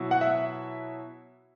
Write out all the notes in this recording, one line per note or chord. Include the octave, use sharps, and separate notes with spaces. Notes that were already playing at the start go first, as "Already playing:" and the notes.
Already playing: B2 F#3 E4
F#5
E5